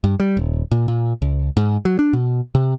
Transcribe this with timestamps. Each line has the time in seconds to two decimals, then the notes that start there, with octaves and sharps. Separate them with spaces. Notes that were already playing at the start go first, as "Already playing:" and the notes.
0.04 G2
0.20 G3
0.37 D#1
0.71 A#2
0.88 A#2
1.22 C#2
1.57 G#2
1.85 F#3
1.99 D4
2.13 B2
2.55 C3